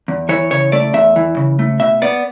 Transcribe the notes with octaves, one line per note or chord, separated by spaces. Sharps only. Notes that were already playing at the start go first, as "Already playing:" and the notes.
E2
E3 C#5
C#3 C#5
A3 D5
E2 E5
E3
C#3
A3
B2 E5
B3 D5